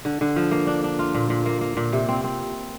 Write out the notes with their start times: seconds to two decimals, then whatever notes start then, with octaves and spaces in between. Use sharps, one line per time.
0.05 D3
0.21 D3
0.36 F3
0.51 A#3
0.67 D4
0.84 D4
0.99 F4
1.15 A#2
1.30 A#2
1.46 A#3
1.61 A#3
1.77 A#2
1.93 C3
2.09 C4
2.24 C4